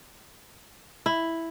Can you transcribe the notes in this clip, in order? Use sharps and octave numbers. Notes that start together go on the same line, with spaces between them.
E4